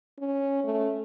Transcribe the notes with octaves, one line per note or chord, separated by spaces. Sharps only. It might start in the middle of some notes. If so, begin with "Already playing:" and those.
C#4
A3